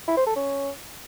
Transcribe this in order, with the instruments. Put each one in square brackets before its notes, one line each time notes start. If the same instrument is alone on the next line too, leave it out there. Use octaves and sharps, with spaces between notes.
[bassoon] E4
C5
A4
C#4